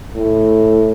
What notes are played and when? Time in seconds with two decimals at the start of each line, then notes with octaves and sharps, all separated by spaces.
0.13 A2